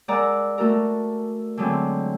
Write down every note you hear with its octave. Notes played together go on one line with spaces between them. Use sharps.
G#3 A#4 D5 F#5 A#5 E6
A3 F#4 A4 A#4
D3 F#3 G#3 A3 C4